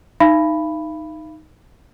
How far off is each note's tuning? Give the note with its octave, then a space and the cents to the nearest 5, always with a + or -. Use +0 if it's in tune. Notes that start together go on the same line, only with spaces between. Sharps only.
D#4 +0 F5 -45 B5 +0